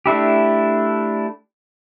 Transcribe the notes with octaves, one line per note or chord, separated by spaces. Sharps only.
A3 D4 E4 G4